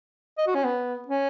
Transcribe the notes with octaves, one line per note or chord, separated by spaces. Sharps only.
D#5
F#4
C#4
B3
C#4